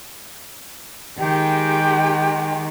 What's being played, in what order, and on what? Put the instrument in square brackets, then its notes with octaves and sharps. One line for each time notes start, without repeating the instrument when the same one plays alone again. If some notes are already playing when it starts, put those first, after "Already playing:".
[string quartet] D#3 G#3 [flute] G4 [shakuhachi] G5